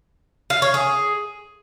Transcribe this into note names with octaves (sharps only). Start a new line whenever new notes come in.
F5
C#5
G#4